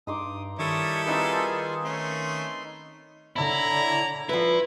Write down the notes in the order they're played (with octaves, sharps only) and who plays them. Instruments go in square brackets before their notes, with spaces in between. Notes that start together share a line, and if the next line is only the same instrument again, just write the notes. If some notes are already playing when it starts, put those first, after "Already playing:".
[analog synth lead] G2 [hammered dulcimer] D#4 C6 D6 [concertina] D#6
[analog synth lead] D#3 [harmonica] G3 E4 A4 [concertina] C#5 C#6 D#6
[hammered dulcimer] C4 D#4 B4 [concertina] F4 G#4 G#5
[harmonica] A3 C#4 [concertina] C6
[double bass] D3 [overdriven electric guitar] E4 [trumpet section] C#5 A#5
[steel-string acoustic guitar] F3 B4 [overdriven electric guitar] E4